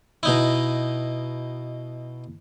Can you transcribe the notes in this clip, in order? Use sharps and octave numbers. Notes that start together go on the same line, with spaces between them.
B2 D#4 E4